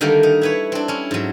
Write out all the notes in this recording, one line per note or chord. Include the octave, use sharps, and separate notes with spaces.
D3 D#3 G3 A3 A#3
D#4
E4 B4 C#5
C4 D4
C#4 E4
G#2 F#3